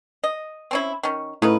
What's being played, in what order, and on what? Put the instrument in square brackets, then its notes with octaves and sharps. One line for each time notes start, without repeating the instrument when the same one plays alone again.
[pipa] D#5
C4 C#4 E4
D#3 C#4
[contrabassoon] A2 [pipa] C#3 D#4 B4